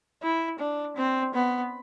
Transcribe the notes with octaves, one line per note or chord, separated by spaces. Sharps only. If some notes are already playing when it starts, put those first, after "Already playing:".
E4
D4
C4
B3